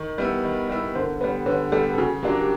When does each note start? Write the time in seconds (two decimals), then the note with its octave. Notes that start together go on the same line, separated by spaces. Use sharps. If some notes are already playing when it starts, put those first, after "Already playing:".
Already playing: D#3
0.18 G3 B3 E4
0.44 D#3
0.69 G3 B3 E4
0.95 D3 A#4 C5
1.20 G3 B3 B4 C#5
1.46 D3 B4 C#5
1.72 G3 B3 G4 A4
1.93 A4
1.98 C#3 F#4 G#4
2.23 F#3 A#3 D4 F4 G4
2.41 G4